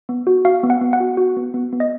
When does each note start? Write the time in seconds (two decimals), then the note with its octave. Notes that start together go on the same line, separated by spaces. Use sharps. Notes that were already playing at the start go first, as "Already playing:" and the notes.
0.09 B3
0.27 F#4
0.45 F#4 F5
0.63 B3
0.70 F#5
0.81 B3
0.93 F#5
1.00 F#4
1.17 F#4
1.37 B3
1.54 B3
1.72 B3
1.80 D#5